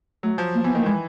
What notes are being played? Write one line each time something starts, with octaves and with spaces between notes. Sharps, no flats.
F#3 A3
F3
A#3
E3 B3
D#3 A#3
E3 G#3